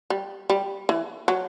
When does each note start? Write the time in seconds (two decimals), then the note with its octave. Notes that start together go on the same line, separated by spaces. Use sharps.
0.10 G3
0.50 G3
0.89 E3
1.28 F#3